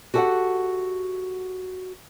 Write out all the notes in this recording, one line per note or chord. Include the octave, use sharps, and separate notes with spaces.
F#4 G4 A4 D#5 E5 F#5